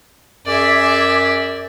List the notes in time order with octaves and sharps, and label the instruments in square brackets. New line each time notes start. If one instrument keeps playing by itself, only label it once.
[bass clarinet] F#2 [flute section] G#4 D6 [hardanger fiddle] D5 E5